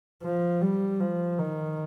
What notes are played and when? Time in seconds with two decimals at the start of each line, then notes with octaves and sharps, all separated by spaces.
0.23 F3
0.61 G3
1.00 F3
1.39 D#3